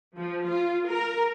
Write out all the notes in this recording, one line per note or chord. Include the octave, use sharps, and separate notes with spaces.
F3
F4
A#4